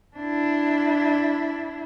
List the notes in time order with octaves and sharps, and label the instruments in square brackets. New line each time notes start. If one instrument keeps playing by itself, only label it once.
[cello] D4 E4